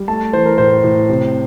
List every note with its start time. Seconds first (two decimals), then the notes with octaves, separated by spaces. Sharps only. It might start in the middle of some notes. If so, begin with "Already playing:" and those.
Already playing: G3
0.08 A3 A5
0.33 E3 C5
0.46 A#4
0.58 A2 C5
0.84 A2
1.09 C3